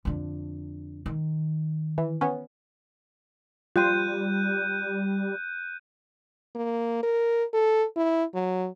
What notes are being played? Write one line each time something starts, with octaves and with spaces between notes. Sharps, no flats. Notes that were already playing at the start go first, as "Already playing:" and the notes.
F2 D3
D#3
E3
B3 C#4
G3 F4 G5 C6 F#6 G6 D#7
A#3
A#4
A4
E4
F#3